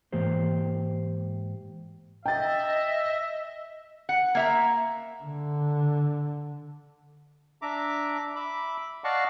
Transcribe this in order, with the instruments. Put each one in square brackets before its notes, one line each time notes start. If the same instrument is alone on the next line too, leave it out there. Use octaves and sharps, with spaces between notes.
[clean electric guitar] G#2 E3 A#3 G4 C5
[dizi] D#5 [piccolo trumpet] E5 [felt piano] G5 A6
[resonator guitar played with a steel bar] F#5
A#3 E5 A#5
[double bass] D3
[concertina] D4 E5 A#5 D6
E5 B5 D6
D5 D#5 F5 F#5 A5 C#6